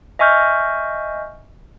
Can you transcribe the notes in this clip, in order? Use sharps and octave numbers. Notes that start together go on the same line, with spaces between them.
D#5 E5 G#5 C#6 F6 G6